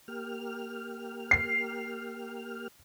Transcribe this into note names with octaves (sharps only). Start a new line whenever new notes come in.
A#3 G4 F6
C7